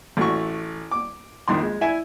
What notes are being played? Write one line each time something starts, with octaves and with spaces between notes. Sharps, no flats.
A1 A3 F#4 C#6
D6
A#1 F2 D#3 C6
G#3
E4 E5 G#5